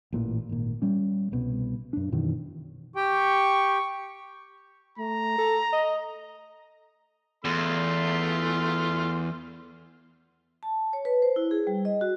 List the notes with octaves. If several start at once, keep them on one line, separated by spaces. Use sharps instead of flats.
A1 A#2 E3
G#1 A#2
G3 C#4
C2 B2
F#2 D4
F#2 B2 D#3 E3
G4 G5 C#6
A3 A#5
A4
D#5
E2 A3 C6 F6
A5
C#5
B4
C5
E4
G#4
G3
D#5
F#4